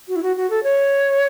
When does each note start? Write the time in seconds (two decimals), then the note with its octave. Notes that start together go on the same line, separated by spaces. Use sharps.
0.08 F#4
0.16 E4
0.23 F#4
0.36 F#4
0.50 A4
0.63 C#5